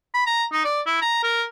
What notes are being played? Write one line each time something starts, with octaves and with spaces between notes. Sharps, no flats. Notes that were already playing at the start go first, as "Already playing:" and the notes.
B5
A#5
D#4
D5
E4
A#5
A#4